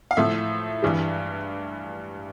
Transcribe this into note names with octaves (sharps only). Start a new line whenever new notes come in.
F5
A2 F3 A3 E5
G2 E3 G3